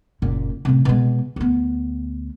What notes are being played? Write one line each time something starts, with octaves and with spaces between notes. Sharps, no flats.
F#1 A#2
A2 C3
B2 G#3
D2 B3